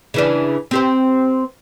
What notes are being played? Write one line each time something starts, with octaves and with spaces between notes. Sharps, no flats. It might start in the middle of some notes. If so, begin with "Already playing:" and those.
C#3 E3 D4
C4 G4 C5